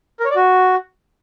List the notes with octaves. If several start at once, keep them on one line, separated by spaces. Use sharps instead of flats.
A#4
C#5
D5
F#4